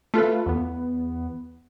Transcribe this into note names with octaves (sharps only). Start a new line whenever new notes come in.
A3 F4 A4 B4
E2 B3